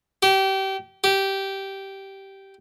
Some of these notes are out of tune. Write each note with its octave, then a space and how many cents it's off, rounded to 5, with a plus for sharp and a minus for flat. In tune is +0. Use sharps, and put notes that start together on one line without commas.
G4 -25
G4 -10